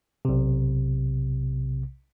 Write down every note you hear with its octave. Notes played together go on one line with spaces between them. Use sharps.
B1 C3